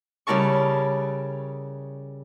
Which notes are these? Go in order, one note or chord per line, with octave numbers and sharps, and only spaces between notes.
C#3 G3 E4 A#4 A5 C#6